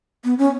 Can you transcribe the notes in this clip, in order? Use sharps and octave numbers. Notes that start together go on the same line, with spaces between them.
B3
C#4